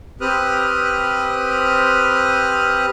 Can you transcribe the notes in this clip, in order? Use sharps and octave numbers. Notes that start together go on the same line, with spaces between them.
C4 G4 B4 D#6 F6 F#6